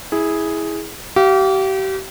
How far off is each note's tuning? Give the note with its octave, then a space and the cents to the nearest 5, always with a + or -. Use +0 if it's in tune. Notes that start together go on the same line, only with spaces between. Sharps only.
E4 -15 G#4 +0
G4 -35 F5 -15